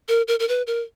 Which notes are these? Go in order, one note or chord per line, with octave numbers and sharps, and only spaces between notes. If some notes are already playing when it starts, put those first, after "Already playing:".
A#4
A#4
A#4
B4
A#4